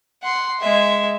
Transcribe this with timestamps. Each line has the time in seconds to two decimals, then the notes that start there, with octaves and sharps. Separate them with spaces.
0.23 F#5 C6
0.61 G#3 E5